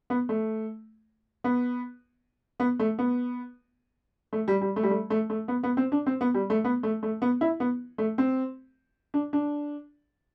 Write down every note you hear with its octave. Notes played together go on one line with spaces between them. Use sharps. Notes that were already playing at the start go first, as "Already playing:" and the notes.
B3
A3
B3
B3
A3
B3
A3
G3
G3
A3
G3
A3
A3
A3
B3
B3
C4
D4
C4
B3
G3
A3
B3
A3
A3
B3
E4
B3
A3
C4
D4
D4